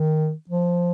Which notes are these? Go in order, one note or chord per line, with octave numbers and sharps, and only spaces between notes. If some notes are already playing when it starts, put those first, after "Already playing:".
Already playing: D#3
F3